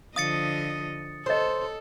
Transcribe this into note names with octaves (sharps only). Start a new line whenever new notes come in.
D3 F3 D#5 F5 D#6 A6 C#7
A4 C5 C#5 D#5